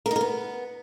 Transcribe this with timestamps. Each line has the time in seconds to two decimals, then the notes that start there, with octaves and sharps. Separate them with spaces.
0.06 A#4
0.11 D#4
0.16 A#4
0.21 B3